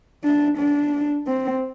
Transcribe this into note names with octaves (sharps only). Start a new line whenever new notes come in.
D4
D4
C4